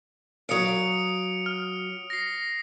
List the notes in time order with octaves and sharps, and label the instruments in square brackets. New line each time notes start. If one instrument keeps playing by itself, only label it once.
[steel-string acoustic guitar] F#3 F5 [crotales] D#6 C#7 D7
[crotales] F6
A#6 C7